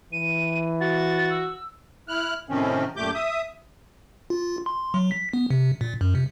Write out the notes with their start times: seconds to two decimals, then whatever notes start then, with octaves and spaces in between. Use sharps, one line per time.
0.13 E3 D#7
0.81 F#4 A6
1.31 E6
2.08 E4 F6 F#6
2.49 A2 C3 D#3 F3 C4 C#4
2.97 F#2 A#2 A3 G4 D6 G6
3.14 E5 D#6
4.30 F4
4.66 C6
4.94 F#3
5.11 B6
5.33 B3
5.50 C3
5.81 A#2
6.01 F#2
6.15 C3